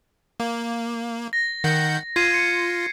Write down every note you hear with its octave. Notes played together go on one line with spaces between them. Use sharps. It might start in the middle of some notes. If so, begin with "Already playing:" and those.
A#3
A#6
D#3 F#5 G6
F4 G#6 C7 D#7
C#7